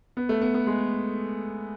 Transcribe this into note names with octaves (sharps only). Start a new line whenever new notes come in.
B3
A3
B3
B3
G#3